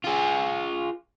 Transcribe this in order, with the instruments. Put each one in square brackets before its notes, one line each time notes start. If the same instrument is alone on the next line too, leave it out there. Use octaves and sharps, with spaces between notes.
[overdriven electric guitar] F4 G#4